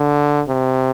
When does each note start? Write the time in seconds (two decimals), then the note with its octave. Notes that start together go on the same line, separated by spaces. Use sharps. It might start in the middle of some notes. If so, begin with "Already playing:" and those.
Already playing: D3
0.48 C3